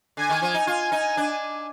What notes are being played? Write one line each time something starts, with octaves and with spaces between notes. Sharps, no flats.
D3 G#5
D#3
F3
D#4
F4
D#4
D4